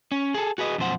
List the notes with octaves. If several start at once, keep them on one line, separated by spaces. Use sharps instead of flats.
C#4
G#4 A4
F#4 G#4 B4 D#5
F#2 B2 F3 C5 F#5